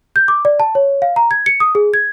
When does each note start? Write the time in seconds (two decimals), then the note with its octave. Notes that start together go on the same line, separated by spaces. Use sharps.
0.16 G6
0.28 D6
0.45 D5
0.60 A5
0.75 C#5
1.02 F5
1.16 A#5
1.31 G#6
1.46 C#7
1.60 D#6
1.75 G#4
1.94 G#6